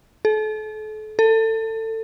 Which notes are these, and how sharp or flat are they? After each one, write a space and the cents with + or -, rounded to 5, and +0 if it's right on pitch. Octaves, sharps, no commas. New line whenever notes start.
A4 -35
A4 +25